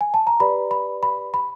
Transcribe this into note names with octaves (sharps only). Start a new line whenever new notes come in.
G#5
A5
A#5
G4 B4 D5 B5
B5
B5
B5